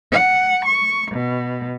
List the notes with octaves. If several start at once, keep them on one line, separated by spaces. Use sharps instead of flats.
F#5
C#6
B2